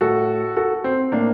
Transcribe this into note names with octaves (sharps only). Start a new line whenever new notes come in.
A2 F#4 A4
F#4 A4
C4
A2 A#3 D4